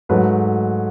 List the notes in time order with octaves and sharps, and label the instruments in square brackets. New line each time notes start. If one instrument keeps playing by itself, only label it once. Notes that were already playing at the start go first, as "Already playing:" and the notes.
[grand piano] G#2 F#3 A3 B4